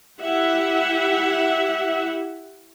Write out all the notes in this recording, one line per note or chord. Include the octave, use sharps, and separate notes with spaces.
E4 G4 E5 F#5